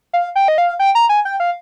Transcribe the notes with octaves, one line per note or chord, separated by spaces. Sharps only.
F5
G5
D#5
F5
G5
A#5
G#5
G5
F5